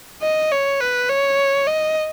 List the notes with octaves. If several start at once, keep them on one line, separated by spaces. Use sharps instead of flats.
D#5
C#5
B4
C#5
D#5